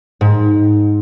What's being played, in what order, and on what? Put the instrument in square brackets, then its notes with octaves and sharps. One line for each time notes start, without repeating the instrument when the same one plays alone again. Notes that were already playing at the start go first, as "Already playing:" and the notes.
[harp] G#2